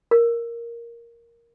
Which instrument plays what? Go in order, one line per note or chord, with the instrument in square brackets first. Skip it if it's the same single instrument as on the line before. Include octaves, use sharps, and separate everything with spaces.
[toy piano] A#4